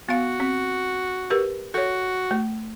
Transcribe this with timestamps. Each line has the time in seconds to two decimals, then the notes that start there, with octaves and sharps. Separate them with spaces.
0.09 B3 F#4 F5
0.40 C4
1.30 G4 A#4 B4
1.74 F#4 A4 C#5
2.31 A3